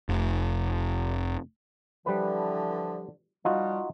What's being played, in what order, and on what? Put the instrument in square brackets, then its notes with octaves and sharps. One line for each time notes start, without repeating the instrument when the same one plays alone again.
[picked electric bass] F1
[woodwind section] D3 E3 F3 [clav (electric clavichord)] G3 B4
[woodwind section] F3 G3 [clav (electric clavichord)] D#4 F4 F#4